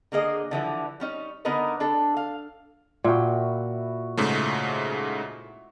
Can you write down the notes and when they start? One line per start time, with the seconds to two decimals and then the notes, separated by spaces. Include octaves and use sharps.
0.12 D3 A#3 G#4 D#5
0.51 D3 E3 F3 G3
1.00 G3 C#4 D#4
1.45 D3 B3 D#4 A#4 B4 D#5
1.80 D4 A4
2.17 F5
3.04 A#2 E4 F#4 G5
4.17 G#2 C#3 A3